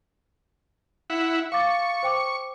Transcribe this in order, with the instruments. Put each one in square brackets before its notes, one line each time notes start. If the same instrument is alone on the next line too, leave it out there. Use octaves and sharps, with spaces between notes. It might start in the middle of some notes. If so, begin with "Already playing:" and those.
[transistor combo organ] E4 F#5
[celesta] F5 D6 A6 [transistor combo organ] C#6
[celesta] C5 G5 D6